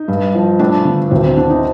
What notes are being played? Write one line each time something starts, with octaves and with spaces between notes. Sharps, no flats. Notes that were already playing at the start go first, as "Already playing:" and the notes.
Already playing: D#4
G2
F3
A3 D4
D3
D2 C4
C4
D3 D4
D#4